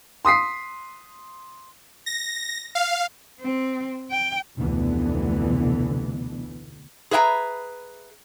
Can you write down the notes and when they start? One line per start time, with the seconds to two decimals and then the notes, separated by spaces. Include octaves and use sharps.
0.25 C6 D#6 B6 C7
2.06 A#6
2.75 F5
3.41 C4
4.11 G5
4.58 F1 D2 B2 D3 E3 B3
7.11 G#4 B4 E5 G5 A#5